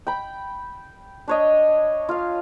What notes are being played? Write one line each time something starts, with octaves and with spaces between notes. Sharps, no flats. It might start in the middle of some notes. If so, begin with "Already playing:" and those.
G5 B5
D4 C#5 D#5
F4 F5